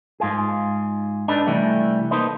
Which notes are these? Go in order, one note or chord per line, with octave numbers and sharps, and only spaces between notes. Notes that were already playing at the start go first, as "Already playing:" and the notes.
G#2 F4 G#4
D4 D#4 A4 B4
C3 E3 G3 A3
A#3 D#4 A4 B4 C5 D#5